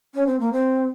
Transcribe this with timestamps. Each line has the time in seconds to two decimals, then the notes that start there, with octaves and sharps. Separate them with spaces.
0.15 C#4
0.26 C4
0.40 A#3
0.53 C4